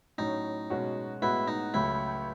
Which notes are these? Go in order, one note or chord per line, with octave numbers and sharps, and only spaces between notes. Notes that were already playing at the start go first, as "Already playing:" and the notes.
A2 F#3 C#4 D#4
B2 G#3 C#4 F#4
A2 G#3 B3 E4 F#4
D#4
C#2 C#3 F#3 A3 E4